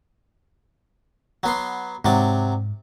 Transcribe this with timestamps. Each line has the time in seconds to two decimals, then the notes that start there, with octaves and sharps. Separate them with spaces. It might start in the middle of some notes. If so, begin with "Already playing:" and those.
1.43 F#3 B3 C6
2.05 G#2 C3 F#3 D5